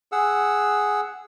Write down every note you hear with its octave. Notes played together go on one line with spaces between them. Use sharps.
G#4 F#5 E6